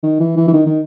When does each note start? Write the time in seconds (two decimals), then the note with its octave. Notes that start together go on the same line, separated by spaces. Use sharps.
0.04 D#3
0.20 E3
0.37 E3
0.48 E3
0.54 D#3
0.67 D#3